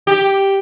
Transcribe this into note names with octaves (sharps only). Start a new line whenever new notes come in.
G4